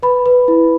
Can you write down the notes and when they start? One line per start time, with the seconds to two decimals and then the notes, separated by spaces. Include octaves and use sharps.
0.03 B4 B5
0.26 B4
0.48 E4